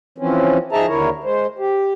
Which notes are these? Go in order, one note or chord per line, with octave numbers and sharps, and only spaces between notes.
E3 F3 C4 C#4
F3 D#4 G#4 E5 A5 A#5
D#2 D3 E4 A#4 C#5
G#3 C5
G4